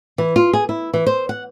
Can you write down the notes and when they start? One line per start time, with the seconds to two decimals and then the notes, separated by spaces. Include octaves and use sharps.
0.18 E3
0.36 F4
0.53 G#4
0.69 E4
0.94 E3
1.06 C5
1.29 F#5